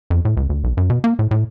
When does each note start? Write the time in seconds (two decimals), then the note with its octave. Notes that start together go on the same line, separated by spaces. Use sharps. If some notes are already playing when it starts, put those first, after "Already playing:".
0.10 F2
0.25 A2
0.37 C#2
0.50 D2
0.64 B1
0.77 F#2
0.90 B2
1.04 A#3
1.19 A2
1.31 A2